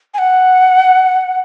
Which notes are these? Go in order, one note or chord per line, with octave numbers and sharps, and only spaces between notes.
G#5
F#5